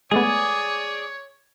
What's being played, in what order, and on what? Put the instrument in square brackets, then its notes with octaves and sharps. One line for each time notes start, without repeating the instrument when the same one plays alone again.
[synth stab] G#3 A3 B3 [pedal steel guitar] G#4 D5 [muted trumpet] C#5